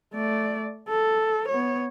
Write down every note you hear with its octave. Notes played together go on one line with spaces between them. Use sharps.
A3 D5
A4
B3 C#5